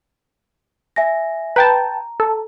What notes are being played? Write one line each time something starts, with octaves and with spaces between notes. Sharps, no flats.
E5 G#5 A#6
B4 G5 A5 A#5
A4